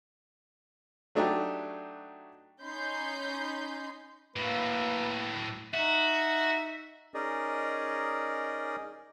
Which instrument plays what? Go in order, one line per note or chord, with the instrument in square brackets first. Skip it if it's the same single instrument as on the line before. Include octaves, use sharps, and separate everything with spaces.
[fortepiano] F#3 A3 D4 D#4 F#4 G4
[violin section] C#4 D#4 B5 C6 G6
[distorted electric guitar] A2 F#3 [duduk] A#3 [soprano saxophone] B4
[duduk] D#4 [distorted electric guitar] F#4 [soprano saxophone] E5
[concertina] C#4 D#4 G#4 A#4 D5 D#5